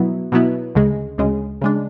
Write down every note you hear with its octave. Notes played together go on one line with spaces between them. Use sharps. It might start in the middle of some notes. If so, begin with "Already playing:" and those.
Already playing: B2 F#3 B3 E4
B2 F#3 B3 E4
D2 C#3 G#3
D2 C#3 G#3
C#3 G#3 D4